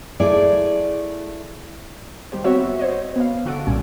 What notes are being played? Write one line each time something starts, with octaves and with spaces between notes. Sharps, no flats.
A3 E4 G#4 D5
D#3 G3 G4 C5
B3 C4 F#4 C#5 E5
C5 C#5 D#5
B3 F5
D3 F#4 A4 D7
B1 A#2 G3 C#4 G#5